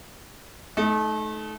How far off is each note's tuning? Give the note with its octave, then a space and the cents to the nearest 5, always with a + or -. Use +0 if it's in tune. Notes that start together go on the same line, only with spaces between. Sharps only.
A3 -30 D#4 +10